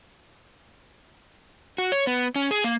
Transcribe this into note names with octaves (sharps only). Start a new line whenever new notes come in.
F#4
C#5
B3
C#4
G#4
A#3